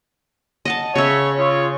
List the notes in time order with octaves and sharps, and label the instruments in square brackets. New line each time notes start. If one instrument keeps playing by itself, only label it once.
[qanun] D#5 F#5 A5
[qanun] C#3 E5 [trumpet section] C#5
[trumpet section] F4 G#4 C#5